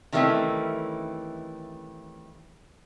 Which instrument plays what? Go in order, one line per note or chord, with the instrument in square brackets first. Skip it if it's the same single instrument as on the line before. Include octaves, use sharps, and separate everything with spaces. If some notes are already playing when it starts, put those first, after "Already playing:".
[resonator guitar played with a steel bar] D#3 E3 G3 A3 C4 C#4